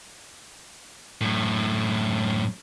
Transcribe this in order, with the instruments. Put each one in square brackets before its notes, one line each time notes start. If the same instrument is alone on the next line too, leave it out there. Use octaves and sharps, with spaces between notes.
[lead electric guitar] F#2 A2